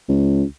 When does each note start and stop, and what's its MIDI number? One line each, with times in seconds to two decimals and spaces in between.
0.08 0.44 37